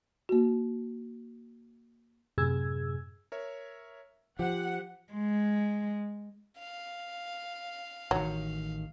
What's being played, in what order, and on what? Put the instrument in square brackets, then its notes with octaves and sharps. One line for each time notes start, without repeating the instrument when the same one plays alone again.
[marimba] A#3 F#4
[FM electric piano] F#2 A2 C3 G#4 E6 G#6
[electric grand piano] A#4 C#5 E5
[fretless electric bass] F3 [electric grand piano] G4 C5 [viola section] F#5
[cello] G#3
[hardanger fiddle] F5
[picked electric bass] A1 D#3 [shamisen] F#3